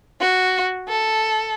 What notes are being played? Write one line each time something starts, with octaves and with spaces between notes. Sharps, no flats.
F#4
A4